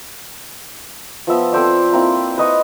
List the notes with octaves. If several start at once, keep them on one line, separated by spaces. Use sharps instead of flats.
F3 B3 E5
C4 A4 C5 D5
A#3 C4 E4
B4 D#5 C#6